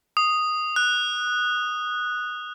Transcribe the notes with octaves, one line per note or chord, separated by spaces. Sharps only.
D#6
F#6